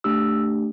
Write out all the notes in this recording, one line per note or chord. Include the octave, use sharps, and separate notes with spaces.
A3 D4 G4 E6